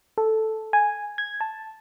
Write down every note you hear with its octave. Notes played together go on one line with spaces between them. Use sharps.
A4
G#5
G#6
A5